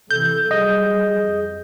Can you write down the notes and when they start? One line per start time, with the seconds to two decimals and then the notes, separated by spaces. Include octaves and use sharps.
0.11 C3 E3 A4 G6
0.51 F#3 G3 G#4 D#5
1.22 F2